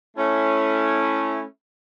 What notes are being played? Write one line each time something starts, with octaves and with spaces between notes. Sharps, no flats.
A3 C#4 E4